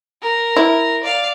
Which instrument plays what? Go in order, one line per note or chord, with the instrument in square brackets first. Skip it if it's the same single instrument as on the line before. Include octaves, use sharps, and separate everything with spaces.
[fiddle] A#4
[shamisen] E4
[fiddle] D5 F5